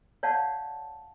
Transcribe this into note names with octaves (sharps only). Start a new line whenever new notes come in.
C#5 D5 F5 F#5 A5